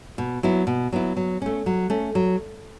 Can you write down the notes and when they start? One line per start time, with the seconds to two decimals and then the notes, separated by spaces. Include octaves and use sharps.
0.18 B2
0.43 F#3 B3 E4
0.67 B2
0.92 F#3 B3 E4
1.17 F#3
1.42 A3 C#4
1.66 F#3
1.90 A3 C#4
2.15 F#3